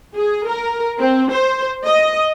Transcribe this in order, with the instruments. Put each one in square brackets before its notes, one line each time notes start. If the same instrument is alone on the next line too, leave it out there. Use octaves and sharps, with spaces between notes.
[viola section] G#4
A#4
C4
C5
D#5